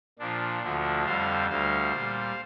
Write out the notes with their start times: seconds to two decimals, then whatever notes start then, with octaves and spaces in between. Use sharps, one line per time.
0.19 A#2 F3 D4
0.63 D2 D3 F3
1.05 F2 D3 G3 C5 F5
1.49 D2 D3 G3 C5 F5
1.93 A#2 G3